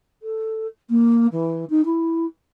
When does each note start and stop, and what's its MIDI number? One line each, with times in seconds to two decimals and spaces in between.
0.22 0.67 69
0.89 1.26 58
1.31 1.64 52
1.69 1.84 63
1.85 2.25 64